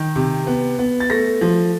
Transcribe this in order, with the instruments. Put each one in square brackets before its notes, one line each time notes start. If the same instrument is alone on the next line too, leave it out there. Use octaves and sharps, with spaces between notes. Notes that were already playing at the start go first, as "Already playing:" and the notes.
Already playing: [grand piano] D#3
C3
B3
B3
A6
A3 A#6
F3